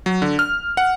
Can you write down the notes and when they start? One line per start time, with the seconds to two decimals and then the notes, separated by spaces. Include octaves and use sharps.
0.06 F#3
0.22 D3
0.39 F6
0.77 F#5